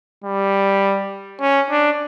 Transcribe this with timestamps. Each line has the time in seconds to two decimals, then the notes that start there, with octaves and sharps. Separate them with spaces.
0.24 G3
1.41 C#4
1.70 D4